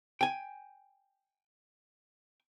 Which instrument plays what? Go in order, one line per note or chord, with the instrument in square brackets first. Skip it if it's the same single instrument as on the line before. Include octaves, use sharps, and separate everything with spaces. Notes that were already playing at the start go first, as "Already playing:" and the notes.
[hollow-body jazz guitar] G5 G#5